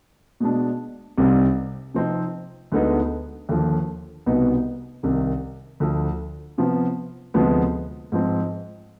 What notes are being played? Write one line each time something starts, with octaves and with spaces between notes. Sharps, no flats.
B2 G#3 D4
C2 C3 G3 C4 D#4
C3 F3 C4 D#4
D2 D3 G#3 B3 D#4
D#2 D3 F3
C2 B2 B3 D#4
C2 C3 D#3
D2 D3 F3
C3 F3 B3
D2 C3 F3 G#3 B3
G#2 F3 C4